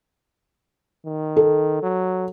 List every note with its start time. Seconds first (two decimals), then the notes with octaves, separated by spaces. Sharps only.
1.06 D#3
1.37 A4
1.83 F#3